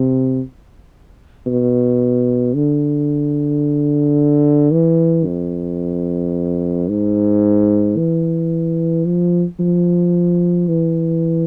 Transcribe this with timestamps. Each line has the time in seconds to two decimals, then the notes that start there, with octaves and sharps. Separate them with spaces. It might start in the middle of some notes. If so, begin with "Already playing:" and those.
Already playing: C3
1.47 B2
2.55 D3
4.72 E3
5.26 F2
6.89 G#2
7.97 E3
9.05 F3
9.60 F3
10.68 E3